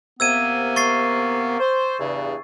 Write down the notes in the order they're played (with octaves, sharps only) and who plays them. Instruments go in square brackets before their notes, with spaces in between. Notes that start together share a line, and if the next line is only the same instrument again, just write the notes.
[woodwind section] C3 A#3 B3 [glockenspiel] E6 G#6 D#7
[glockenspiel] C#6 A6 C7
[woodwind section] C5
E2 G2 C#3